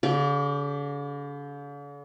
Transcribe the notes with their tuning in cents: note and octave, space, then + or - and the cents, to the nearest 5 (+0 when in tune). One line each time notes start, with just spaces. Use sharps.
D3 -45 G4 +0 D5 -45